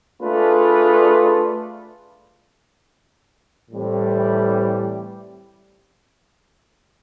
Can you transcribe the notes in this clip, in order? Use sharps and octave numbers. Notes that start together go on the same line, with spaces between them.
A3 D4 F4 G#4 B4
A2 E3 G3 C4